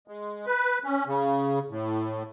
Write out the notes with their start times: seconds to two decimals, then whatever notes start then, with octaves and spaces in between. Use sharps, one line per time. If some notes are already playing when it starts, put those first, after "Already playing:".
0.08 G#3
0.46 B4
0.84 C#4
1.06 C#3
1.70 A2